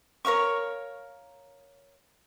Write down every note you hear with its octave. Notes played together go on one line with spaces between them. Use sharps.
A#4 C#5 F5 C#6